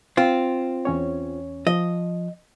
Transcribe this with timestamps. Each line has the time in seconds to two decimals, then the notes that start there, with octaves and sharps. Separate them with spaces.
0.17 C4 F4
0.85 E2 C#4 C#5
1.67 F3 D#5